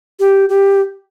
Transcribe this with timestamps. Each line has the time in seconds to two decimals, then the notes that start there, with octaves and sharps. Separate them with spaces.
0.20 G4
0.49 G4